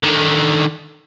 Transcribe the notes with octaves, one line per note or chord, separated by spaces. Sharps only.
D3 D#3